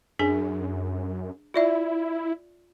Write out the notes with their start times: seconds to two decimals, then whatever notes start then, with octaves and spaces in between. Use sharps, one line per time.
0.19 F#2 D4 G#4 G#5
1.54 E4 F4 D5 E5